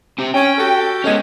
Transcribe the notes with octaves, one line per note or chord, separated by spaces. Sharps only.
C4 G4
C#4 G5
F#4 G4 A4
G#3 B3 C#4